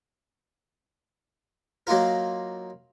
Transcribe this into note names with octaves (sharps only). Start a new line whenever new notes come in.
F#3 A#3 D#4 F4 A#4